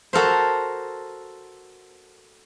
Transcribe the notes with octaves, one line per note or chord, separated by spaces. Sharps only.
F#4 A4 A#4 C5